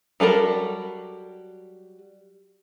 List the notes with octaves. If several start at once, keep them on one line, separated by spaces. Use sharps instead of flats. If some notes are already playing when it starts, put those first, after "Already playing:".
F#3 G3 A4 A#4